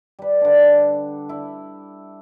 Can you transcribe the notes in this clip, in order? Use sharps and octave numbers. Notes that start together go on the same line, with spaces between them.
G3 B4
D3 D4
E4